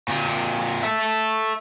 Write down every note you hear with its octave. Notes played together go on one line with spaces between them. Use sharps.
A#2 C4
A4 E5